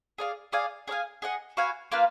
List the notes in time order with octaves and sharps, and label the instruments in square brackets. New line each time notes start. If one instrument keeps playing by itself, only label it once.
[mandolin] G#4 D5 F5
G#4 D5 F5 G#5
G#4 D5 F5 G#5
G#4 D#5 F#5
F#4 B4 F5 G#5
A#3 F4 B4 F5